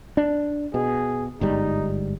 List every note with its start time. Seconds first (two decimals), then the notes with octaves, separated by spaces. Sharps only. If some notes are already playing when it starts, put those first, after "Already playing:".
0.17 D4
0.74 B2 G#4
1.41 G1 G#2 G3 D#4